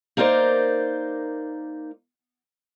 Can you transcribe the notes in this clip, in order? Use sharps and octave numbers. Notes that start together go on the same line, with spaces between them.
A#3 D#4 A#4 C5 D5